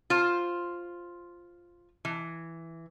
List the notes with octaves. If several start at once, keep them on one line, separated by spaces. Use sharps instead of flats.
F4 C5
E3